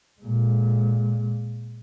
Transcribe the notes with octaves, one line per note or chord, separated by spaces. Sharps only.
A#2 G#3